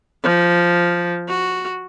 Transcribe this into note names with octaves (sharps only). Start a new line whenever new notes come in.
F3
F#4